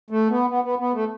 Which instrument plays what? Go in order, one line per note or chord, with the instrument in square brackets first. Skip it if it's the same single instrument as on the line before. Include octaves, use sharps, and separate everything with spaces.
[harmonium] A3
B3
B3
B3
B3
A3